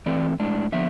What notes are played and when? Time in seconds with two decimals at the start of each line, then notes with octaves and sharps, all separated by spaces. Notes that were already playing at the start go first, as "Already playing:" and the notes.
0.06 E3 A3 C4 D5
0.39 A2 G#3 D4
0.72 D3 F3 B3 E5